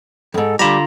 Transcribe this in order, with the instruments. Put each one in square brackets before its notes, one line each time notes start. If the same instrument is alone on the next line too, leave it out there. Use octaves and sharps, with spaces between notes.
[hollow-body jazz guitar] F2 G#2 [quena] A4
[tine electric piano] D3 F4 A#5 [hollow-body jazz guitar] G3 [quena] D6